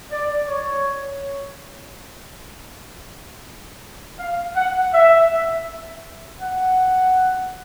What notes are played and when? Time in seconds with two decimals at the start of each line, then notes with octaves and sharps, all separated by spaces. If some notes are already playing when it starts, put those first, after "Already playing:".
0.11 D5
0.47 C#5
4.19 F5
4.55 F#5
4.93 E5
6.41 F#5